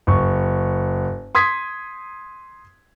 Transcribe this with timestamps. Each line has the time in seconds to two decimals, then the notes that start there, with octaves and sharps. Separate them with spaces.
0.07 F#1 C#6
1.35 C6 D#6 G#6 B6